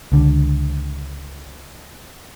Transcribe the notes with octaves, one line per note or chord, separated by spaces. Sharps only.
C#2 D3